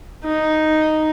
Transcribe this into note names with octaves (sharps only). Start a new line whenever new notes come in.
D#4